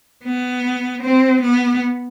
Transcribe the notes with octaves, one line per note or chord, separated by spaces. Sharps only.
B3
C4
B3